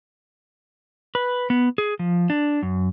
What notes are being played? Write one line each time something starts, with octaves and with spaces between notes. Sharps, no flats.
B4
B3
G#4
F3
D4
F#2